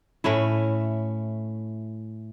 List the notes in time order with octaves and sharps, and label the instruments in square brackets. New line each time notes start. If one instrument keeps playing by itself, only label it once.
[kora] A2 A3 C#4 E4